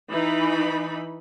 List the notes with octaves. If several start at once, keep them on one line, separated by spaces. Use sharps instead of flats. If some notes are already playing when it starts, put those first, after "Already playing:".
E3 D#4 B5